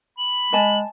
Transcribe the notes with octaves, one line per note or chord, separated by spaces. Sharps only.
B5 F#7
G#3 D#5 G#5 A5